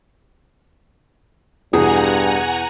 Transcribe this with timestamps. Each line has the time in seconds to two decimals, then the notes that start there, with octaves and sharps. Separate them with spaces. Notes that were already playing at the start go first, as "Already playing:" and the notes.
1.73 E2 G2 B2 G#4 F#5 G#5 A#5